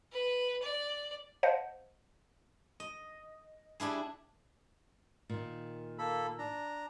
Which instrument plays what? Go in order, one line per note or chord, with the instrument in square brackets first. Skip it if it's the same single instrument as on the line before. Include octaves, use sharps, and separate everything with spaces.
[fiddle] B4
D5
[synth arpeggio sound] C5 D#5 F5 F#5 A5
[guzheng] D#5
G3 D4 E4 G#4
[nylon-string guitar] A#2 D#3
[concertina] A#3 A4 B5
D4 A#5